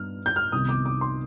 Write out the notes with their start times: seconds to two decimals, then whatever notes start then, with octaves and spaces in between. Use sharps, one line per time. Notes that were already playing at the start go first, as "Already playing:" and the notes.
Already playing: G2 B3 F6
0.26 G6
0.36 F6
0.52 C2 C3 D#3 B3 D#4 D#6
0.69 D6
0.86 D6
1.01 C6